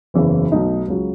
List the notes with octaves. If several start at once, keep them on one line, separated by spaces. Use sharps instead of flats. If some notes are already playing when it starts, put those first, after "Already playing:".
F#1 E2 C#3 E3
B1 B2 A3 D#4
C#2 C#3 F#3